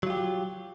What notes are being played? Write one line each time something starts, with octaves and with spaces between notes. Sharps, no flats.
F#3 F4 G4